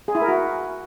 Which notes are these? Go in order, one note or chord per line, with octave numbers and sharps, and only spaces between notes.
G#4
E4
A#4
F#4